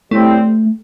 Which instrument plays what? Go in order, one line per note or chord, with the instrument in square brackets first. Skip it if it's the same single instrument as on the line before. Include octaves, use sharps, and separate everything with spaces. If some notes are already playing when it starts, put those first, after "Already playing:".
[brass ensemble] A2 G3 C4 [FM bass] A3